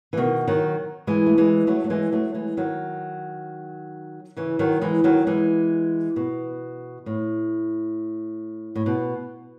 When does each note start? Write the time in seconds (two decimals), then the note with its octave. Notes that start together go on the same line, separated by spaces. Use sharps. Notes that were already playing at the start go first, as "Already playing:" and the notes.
0.13 E3
0.17 B2 D#3
0.48 D#3 F#3
1.07 E3 G#3
1.26 A3
1.38 E3 G#3
1.67 F#3 A3
1.84 A3
1.90 E3 G#3
2.12 F#3 A3
2.35 E3 G#3
2.57 D#3 F#3
4.37 C#3 E3
4.59 D#3 F#3
4.81 E3 G#3
5.04 D#3 F#3
5.27 E3 G#3
6.16 B2
7.06 A2
8.75 A2
8.86 B2